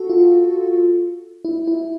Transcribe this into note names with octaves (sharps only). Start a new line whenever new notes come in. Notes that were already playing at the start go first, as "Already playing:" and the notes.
Already playing: F#4 A4
F4
E4
E4